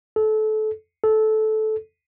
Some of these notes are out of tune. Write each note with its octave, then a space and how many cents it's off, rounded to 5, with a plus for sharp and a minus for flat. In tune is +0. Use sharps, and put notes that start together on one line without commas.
A4 -25
A4 -15